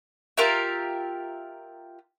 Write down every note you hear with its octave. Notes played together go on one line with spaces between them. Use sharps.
F4 G4 A#4 E5